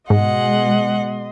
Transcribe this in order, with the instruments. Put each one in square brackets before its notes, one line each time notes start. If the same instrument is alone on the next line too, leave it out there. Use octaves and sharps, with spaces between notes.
[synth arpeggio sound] G#2 [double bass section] B2 G#3 [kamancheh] D#5 C6 [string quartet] F#5